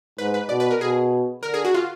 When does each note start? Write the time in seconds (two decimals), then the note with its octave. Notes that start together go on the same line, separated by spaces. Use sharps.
0.18 G#2 B4
0.34 B4
0.49 B2 D5
0.60 B4
0.71 A#4
0.81 B2 G#4
1.43 D3 A#4
1.54 G#4
1.65 F#4
1.74 F4